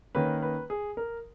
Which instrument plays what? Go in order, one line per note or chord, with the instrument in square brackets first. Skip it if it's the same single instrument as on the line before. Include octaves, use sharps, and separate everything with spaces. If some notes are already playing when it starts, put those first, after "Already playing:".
[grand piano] D#3 A#3 C#4 B4
B4
G#4
A#4